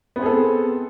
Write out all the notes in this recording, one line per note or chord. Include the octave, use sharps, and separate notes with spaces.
B3 C4 G#4 A4